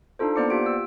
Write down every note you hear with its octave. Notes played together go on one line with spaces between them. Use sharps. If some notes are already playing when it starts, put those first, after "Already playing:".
D4 D#4 F4 A4 C5
A#3 B3 C5 D5 D6 C#7
F4 G4 D7
E6